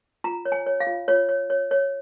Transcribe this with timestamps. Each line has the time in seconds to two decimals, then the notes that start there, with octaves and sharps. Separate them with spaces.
0.24 F4 A#5
0.45 C#5
0.52 G#5
0.66 C#5
0.80 F5
0.87 F4
1.08 F4 C#5
1.29 C#5
1.50 C#5
1.71 C#5